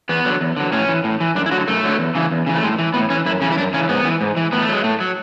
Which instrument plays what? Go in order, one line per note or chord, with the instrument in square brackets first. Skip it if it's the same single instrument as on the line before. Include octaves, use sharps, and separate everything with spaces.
[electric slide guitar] E2 B3
D3 F#3
E2
D3 F#3
A2 C#4
E3
A2
E3
F#2 D4
E4
D3 F#3 F#4
F#2 A3
D3 F#3
E2
C#3 E3
E2
C#3 E3
A3
A2 G#3
E3
A2 B3
E3 C#4
F#2 E4
C#3 E3 C#4
E4
F#2 D4
C#3 E3 C#4
G#2 B3
E3
G#2
E3
A2 B3
A3
F#3 G#3
A2 A3
F#3